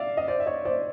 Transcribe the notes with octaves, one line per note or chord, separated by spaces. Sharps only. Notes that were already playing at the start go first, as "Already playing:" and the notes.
Already playing: D5 E5 F5
D#5
C5 D5
E5
C#5 D#5
C5 D5